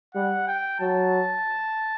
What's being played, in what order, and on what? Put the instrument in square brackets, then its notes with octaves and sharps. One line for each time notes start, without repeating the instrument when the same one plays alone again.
[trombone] G3 [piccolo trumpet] F#5
[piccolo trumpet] G5
[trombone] F#3 [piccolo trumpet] A5